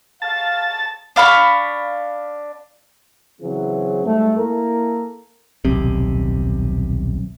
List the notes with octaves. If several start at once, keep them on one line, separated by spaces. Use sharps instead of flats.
F5 A5
D4 F5 B5 C#6
C#3 E3 F#3 C4 G#4
G#2 G3 A3
A#3 E4 A4 A#4
D#1 B1 C3